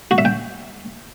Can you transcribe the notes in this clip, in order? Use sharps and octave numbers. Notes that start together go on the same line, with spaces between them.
F#4
E5
G5